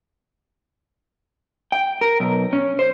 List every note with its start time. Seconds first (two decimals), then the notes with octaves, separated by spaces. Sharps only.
1.72 G5
2.01 A#4
2.20 B1
2.53 C#4
2.79 C5